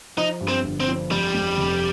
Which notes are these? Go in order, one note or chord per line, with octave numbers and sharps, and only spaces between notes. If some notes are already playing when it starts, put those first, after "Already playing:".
F3 D#4
G2
C4
G1
C4
F3
F2 G3
F2
F1